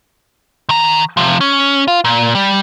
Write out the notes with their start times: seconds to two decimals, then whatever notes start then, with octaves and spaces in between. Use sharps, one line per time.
0.69 D#3 A#5
1.17 C3 F3
1.41 C#4
1.88 F4
2.05 A#2
2.35 G3